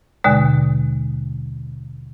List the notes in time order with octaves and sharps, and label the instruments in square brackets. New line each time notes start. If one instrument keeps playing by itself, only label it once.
[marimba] D#2 B2 D3 G#3